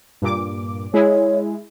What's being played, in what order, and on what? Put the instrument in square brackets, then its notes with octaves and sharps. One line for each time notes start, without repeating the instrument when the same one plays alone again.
[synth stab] G2 A#2 D6
[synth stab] G#3 E4 G#4 [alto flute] C#5